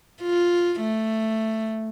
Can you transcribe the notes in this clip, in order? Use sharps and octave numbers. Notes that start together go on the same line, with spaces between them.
F4
A3